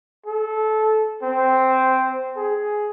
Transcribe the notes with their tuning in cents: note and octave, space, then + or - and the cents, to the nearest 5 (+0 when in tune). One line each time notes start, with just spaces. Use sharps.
A4 -20
C4 -5
G#4 +10